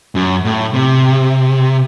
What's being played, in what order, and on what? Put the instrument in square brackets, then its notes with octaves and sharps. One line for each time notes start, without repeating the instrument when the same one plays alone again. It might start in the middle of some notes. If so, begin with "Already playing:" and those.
[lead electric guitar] F#2
A2
C3